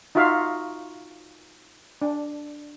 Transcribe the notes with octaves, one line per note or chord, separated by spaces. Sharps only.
D#4 F4 F#4 E5 F5
D4